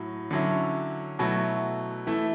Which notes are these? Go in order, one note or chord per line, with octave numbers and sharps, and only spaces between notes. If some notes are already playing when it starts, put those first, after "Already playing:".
Already playing: A2 F#3
D3 F#3 C#4 E4
B2 F#3 A3 E4
E3 A3 E4